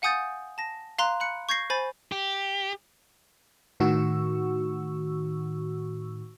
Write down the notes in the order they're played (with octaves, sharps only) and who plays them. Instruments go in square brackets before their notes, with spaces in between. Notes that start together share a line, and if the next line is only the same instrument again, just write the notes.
[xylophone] F5 F#5 G#5 D#6 G6 A6
A5 A#6
F5 A#5 C6 F#6
B5 F#6 C#7
C#6 G6 G#6 A#6 C7
C5 G#5 B5 A6
[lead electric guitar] G4
[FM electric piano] A2 D#3 F#4 C#6 E6